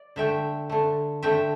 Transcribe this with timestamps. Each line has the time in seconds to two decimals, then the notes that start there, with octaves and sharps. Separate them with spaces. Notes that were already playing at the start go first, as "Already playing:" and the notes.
Already playing: D5
0.16 D3 A3 E5 G5
0.70 D3 A3
1.22 D3 A3 E5 G5